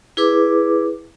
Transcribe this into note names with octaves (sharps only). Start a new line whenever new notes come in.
E4 G#4 B4 D6